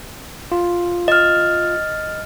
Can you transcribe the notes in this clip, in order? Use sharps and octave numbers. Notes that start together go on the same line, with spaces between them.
F4
D#5 F6